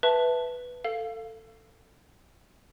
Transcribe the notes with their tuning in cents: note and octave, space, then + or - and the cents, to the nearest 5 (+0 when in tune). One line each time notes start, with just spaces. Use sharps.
B4 +0 E5 +0 A5 +0
A4 +20 F5 +0